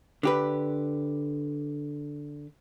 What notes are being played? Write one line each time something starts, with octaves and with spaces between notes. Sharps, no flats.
D3 G4 B4